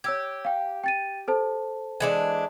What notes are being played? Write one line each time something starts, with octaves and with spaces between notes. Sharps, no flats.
G4 C#5 E6 G#6
F5 G5
G5 A6 D#7
A4 C5 A5
E3 G#3 D4